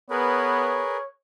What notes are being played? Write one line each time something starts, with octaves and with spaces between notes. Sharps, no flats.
B3 G#4 A#4 B4 C#5